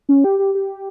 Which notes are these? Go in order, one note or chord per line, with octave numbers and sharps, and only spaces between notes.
C#4
G4
G4
G4